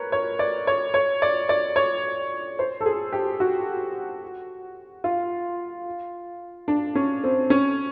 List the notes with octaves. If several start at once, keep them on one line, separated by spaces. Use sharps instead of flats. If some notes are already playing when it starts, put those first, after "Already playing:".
Already playing: A#4 B4 C#5
C#5
D5
C#5
C#5
D5
D5
C#5
C5
A4
G#4
G4
F#4
F4
D4
C#4
C4
C#4